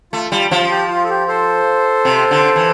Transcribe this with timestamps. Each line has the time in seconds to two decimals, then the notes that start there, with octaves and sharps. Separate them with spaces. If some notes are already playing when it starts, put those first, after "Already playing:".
0.13 A3 F4
0.32 G3 F4
0.51 F3 F4
0.70 G4
0.90 F4
1.04 A4
1.10 G4
1.28 A4 C5
2.05 C3
2.31 D3
2.56 E3